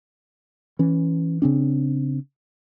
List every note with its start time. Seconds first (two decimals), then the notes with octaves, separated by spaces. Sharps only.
0.79 E3 C#4
1.42 C#3 C4 D4